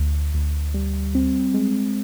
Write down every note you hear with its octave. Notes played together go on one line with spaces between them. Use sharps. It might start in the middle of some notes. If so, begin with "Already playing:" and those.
Already playing: D2
D2
G3
C4
G#3